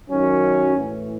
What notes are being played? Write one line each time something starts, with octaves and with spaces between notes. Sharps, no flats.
F#2 D#3 F#3 C#4
A2 E3